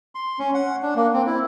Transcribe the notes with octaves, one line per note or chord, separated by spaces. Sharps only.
C6
C#4
F#5
D4
A#3
C4
E4